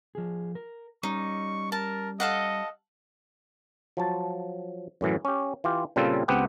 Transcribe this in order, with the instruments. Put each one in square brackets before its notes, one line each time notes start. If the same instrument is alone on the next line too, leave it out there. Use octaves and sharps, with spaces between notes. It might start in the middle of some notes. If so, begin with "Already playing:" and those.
[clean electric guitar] F3 G#4
A#4
[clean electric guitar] G3 C#4 [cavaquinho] D#4 [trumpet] C#6
[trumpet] A#4 [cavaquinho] A5
[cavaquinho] A4 F5 F#5 [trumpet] D#5
[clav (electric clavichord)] F3 F#3 A5
F#2 A2 E3 F#3
C#4 G4
E3 F4 G4
A#2 C#3 G3 C4 F4 A4
C#2 B3 C4 G4 F#5